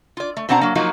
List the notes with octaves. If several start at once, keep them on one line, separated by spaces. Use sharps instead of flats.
F4 D5
A3
B2 C4 D4 C5 F#5 A#5
F#3 A#3
F3 F#3 A#3 D#4 F4 F#4